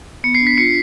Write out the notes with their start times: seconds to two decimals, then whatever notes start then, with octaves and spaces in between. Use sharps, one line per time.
0.24 B3 C#7
0.35 C7
0.41 D4
0.47 B6
0.58 F4 C#7